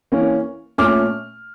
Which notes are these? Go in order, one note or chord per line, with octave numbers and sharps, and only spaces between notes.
E3 A#3 C#4
A#2 A3 C#4 D6 F6